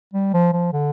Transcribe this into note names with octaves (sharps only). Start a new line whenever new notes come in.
G3
F3
F3
D3